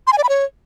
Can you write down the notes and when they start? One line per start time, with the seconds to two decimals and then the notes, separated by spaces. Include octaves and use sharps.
0.07 C6
0.13 G#5
0.18 D5
0.24 B5
0.29 C#5